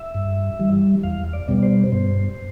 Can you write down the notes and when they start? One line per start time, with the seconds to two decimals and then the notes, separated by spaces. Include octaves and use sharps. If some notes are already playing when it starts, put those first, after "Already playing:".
Already playing: E5
0.15 G2
0.59 E3 G3
1.03 E2 F5
1.33 D5
1.48 B2 G3 B3 D5
1.63 C5
1.92 G2 C5